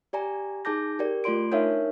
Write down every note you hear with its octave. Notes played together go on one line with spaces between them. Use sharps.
G4 D5 G#5 A#5
D#4 G#4 A5 D6 G6 A#6
G4 A#4 D5
A3 F4 D5 C6 D7
D4 D#4 A#4 C#5 E5 F5